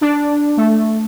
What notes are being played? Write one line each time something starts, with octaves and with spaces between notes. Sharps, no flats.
D4
A3